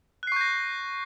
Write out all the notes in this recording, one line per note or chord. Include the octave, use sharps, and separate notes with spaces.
C#6 F#6 G6 A#6 C7